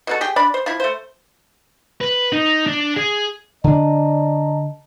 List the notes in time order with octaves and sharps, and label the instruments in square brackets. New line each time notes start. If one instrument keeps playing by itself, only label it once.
[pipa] B2 F#4 A4
G4 G#4 G5
D4 D5 B5
C5
F3 E4
A3 C5
[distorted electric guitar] B4
D#4
D4
G#4
[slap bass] D3 D4 [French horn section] D5 [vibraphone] D#5 A5 A#5